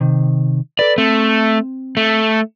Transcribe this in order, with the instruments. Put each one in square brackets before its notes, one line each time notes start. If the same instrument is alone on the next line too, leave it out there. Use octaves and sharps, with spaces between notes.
[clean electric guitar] C3 D#3
[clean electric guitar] A4 B4 [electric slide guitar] D5
[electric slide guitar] A3 [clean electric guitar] C4
[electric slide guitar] A3